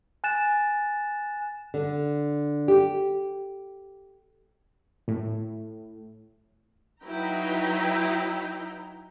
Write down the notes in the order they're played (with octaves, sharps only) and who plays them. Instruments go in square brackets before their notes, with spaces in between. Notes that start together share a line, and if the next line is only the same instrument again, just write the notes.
[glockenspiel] G#5 F#6 A6 E7
[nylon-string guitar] D3
G4
[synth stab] A2
[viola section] F#3 D#4 E4 B4 G5 A#5